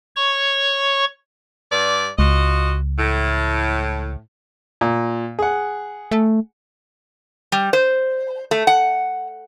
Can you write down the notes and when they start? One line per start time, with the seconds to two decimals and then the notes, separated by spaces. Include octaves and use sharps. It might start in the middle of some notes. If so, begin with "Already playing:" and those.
0.16 C#5 C#6
1.71 G2 D5
2.19 C#2 F4 F#4 D#5
2.99 A2
4.81 A#2
5.39 G#4 F#5
6.11 A3
7.52 G3
7.73 C5
8.51 A3
8.67 F#5